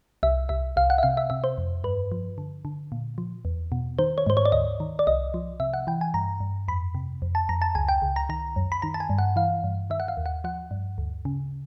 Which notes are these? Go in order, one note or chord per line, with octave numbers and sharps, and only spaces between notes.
C2 E5
C2 E5
C2 F5
F#5
E5
C3 F5
E5
C3 E5
C5
F2
G2 B4
F3
D3
D3
A#2
F3
E2
B2
D#3 C5
C#5
G#2 C5
C#5
D5
D2 D#5
D#3
D5
C2 D#5
F3
C3 E5
F#5
E3 G5
G#5
G2 A#5
G2
F2 B5
C3
F2
A5
F2 A#5
A5
C#2 G#5
G5
C#2
A#5
D#3 A#5
F#2
B5
D#3 A#5
A5
G#5
G2
F#5
E3 F5
G2
D#3 E5
F#5
F5
D#2
F#5
F3 F#5
G2
D2
C#3